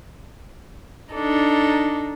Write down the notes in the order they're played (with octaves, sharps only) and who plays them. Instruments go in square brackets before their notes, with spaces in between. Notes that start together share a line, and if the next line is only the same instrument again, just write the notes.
[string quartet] D4 D#4 A4